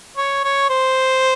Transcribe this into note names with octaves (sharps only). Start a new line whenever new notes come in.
C#5
C#5
C5